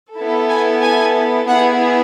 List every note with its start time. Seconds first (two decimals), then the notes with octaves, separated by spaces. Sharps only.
0.14 B3 E4 A4
0.48 G#5
0.81 G#5
1.47 B3 E4 G#4 F#5